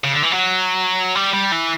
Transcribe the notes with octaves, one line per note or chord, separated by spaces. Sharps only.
C#3
D3
E3
F#3
G3
G3
E3